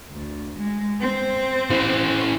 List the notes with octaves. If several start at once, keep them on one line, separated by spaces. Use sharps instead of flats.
D2
G#3
C4 C5
E3 C#4